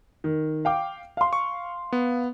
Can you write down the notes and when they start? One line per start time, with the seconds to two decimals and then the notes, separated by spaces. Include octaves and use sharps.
0.24 D#3
0.65 F5 G5 D6
1.17 F5 C6
1.33 C#6
1.92 B3